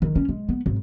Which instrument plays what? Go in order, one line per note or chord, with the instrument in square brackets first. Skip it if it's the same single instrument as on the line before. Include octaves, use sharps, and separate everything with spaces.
[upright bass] D#3
C#4
G#3
B3
G#1